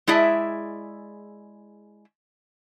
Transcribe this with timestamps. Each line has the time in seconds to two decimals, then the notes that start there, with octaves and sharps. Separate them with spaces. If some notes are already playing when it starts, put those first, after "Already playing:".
0.07 G#3 E4 G#4 D5 E5 A5